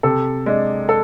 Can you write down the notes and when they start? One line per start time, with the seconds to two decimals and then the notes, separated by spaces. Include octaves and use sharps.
0.03 C3 A4
0.46 G#3 D4
0.89 A4